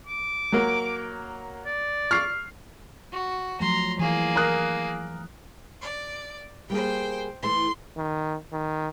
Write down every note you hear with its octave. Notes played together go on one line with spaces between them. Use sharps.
D6
F#3 A#3
D5
C#6 F6 C7
F#4
F3 F#3 A3 A#5 C6
E3 A#3 G#4
A#4 D#6 F#6
D5
G3 A#3 G#4 C5 G5
E3 A3 C6
D#3
D#3